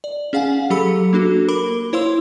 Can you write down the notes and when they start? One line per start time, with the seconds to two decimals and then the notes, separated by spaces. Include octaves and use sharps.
0.04 D5
0.33 C#4 G#4 F5 F#5 G#5
0.70 F#3 G4 A4 B5 E6 C#7
1.13 A#3 D4 F#4 A4
1.49 A#4 B5 D6 G7
1.93 E4 C5 C#5 F5 C6 E6